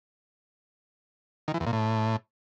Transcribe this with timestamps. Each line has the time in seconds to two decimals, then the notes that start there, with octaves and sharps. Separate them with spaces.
1.48 D#3
1.54 E3
1.60 E2
1.67 A#2
1.73 A2